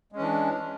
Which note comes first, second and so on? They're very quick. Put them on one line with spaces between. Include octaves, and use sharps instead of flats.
G#3 C#4 E3 D4